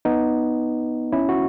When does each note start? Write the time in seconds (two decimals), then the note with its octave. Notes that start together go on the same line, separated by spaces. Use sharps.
0.05 B3 D#4
1.12 C#4 E4
1.29 F#4